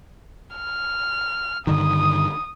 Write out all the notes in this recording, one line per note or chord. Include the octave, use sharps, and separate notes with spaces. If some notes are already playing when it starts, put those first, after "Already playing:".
F6
G2 D3 D#3 D#6